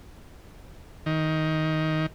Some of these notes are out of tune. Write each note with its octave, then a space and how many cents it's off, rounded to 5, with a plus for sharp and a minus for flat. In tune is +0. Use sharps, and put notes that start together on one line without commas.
D#3 +15